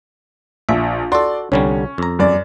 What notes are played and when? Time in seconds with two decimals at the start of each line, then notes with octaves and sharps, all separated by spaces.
0.69 A#1 E5
1.12 F#4 A4 D5 C6
1.52 C2 D3 G3 C#4
1.98 F2 A#5
2.19 F#2 D5